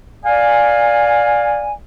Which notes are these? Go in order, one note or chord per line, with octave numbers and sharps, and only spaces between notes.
D5 F5 G#5